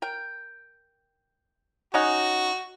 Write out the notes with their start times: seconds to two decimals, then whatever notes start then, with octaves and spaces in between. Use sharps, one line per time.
0.02 A#4 G5
1.94 C#4 D#4 F#4 F#5